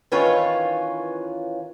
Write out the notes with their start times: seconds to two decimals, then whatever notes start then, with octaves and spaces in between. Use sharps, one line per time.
0.12 D#3 E3 C#4 F4 B4 C#5